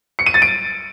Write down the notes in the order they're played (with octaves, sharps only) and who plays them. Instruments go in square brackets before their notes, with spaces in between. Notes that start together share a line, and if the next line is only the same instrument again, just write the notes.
[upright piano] C#7
D#7
A6
D7